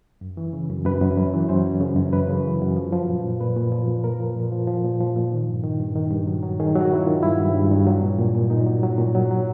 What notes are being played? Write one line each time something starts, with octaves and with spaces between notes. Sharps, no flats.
F#2
E3
C#3
F#2
F#2 B4
F#2
F#2
E3
F#2 C5
F#2
C#3
F#2
F#2 B4
C#3
E3
F#2
F3
F3
A#2
A#2
A#2 B4
A#2
F3
A#2
A#2 A#4
F3
A#2
F3
F3
A#2
F3
A#2
D#3
G2
D#3
G2
D#3
G2
F#3
F#3
D#3 G#4
F#3
F#4
D#3 E4
D#3 F4
G2 E4
G2
G2
G2
F#3
A#2
A#2
A#2
A#2 D#4
F#3
F#3
A#2
F#3
F#3